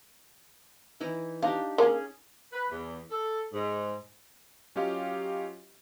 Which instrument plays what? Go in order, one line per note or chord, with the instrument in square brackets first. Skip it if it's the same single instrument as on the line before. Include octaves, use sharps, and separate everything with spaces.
[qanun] E3 D#4 E4
[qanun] D4 D#4 G4 [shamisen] F5
[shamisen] A#3 [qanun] C#4 G#4
[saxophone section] B4
E2
A4
G#2
[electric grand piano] F#3 C#4 F4 G4 D#5 F5